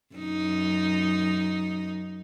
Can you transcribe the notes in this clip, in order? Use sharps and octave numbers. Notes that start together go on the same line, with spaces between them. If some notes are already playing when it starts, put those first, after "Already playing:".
F#2 D#4